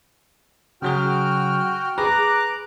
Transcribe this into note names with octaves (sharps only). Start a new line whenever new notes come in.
C#3 F#3 F#4 G#4 G5 F6
G#4 B4 A#5 D6 F#6